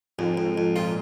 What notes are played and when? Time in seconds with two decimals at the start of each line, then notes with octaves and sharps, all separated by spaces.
0.18 F2 G#2
0.37 F2
0.58 F2
0.76 A#2 F4